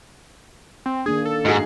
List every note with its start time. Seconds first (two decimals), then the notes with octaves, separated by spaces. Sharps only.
0.86 C4
1.06 D#3 A#3 D4 G#4
1.25 A4
1.45 G#2 D#4 F#4 G#4